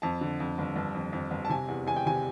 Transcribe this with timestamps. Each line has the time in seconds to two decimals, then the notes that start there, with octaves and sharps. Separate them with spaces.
0.02 F2 A5
0.21 D3
0.40 F2
0.58 G1
0.76 G1
0.95 F2
1.13 F2
1.31 G1
1.45 A5
1.49 C3 G#5
1.68 E2
1.86 E2 G#5
1.96 G5
2.06 C3 G#5